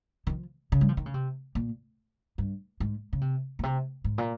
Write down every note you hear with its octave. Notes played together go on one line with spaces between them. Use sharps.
D#3
F3
C#3
G3
F3
D#3
C#3
C3
A#2
G2
G#2
C#3
C3
A#2
C3
G#2
A#2